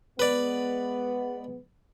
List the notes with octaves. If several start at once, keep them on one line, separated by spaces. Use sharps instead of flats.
G#3 B3 B4 D5